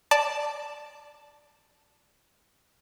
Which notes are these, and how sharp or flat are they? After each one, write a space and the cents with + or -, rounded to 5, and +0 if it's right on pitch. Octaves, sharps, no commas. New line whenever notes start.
D5 +0 A5 +0